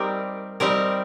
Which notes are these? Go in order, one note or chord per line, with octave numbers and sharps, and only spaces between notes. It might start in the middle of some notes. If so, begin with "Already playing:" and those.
Already playing: G3 C4 D#4 G4 A#4
G3 C4 D#4 G4 A#4